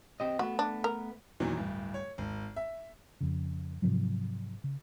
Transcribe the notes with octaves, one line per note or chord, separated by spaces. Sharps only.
C4 G4 D#5
A3 B3 F#4
D4
A#4
E2 A#2 D#3 E3 F#3
D1 G2
C#5
G#1
E5
F2 C#3
G#2 C3 F3 F#3
C#3